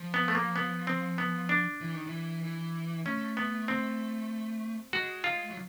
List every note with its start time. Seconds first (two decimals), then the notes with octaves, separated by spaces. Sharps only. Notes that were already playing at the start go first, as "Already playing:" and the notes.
Already playing: F3
0.14 B3
0.28 A3
0.35 A#3
0.56 B3
0.87 C4
1.18 B3
1.49 D4
1.81 E3
1.94 D#3
2.07 E3
2.43 E3
3.06 A3 C#4
3.37 B3
3.68 C4
4.93 G#3 F#4
5.24 F4
5.50 F#3